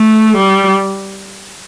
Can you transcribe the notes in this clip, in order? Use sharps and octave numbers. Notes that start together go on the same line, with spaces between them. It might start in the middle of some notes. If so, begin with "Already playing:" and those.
Already playing: A3
G3